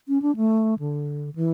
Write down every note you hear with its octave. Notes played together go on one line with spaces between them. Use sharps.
C#4
D4
A3
D3
E3